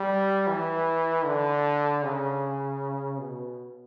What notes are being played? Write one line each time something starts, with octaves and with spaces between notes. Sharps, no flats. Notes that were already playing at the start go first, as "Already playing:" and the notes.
Already playing: G3
E3
D3
C#3
B2